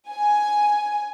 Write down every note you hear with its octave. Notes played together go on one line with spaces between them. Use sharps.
G#5